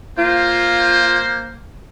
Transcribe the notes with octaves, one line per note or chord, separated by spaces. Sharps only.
A#3 F4 C5